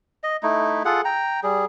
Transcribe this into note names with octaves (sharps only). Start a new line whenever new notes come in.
D#5
A3 D#4 E4
F4 G#4 A4 F#5
G5 A#5
G3 G#4